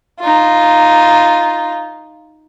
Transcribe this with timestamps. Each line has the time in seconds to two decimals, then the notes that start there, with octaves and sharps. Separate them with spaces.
0.20 D#4 F4